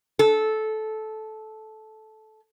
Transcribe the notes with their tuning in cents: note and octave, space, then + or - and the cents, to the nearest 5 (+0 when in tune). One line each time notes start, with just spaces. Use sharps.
A4 -15